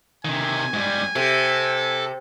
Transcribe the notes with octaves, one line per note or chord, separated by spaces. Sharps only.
C3 D#3 G#5
G#2 G3
C3 A4